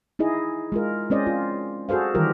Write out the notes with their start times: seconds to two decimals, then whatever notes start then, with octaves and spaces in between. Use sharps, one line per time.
0.19 D#4 E4 G#4 D#5
0.72 G#3 F4 A#4
1.10 G#3 C4 C#4 C5 D5 D#5
1.26 F4
1.89 F#4 G#4 A4 C5 F5
2.15 D#3 E3 G3 F4 G4 A#4